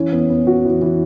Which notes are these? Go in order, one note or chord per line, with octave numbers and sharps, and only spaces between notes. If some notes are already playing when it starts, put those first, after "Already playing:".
Already playing: E3 C#4
B3
B3
F#4
E3
E3